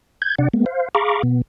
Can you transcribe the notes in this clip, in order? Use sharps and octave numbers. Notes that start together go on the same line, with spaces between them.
G6 G#6
C3 D4 D5 F#5
G#3 A#3 B3
C5 F5
G#4 F5 A#5 B5 C#6 D6
B2 B3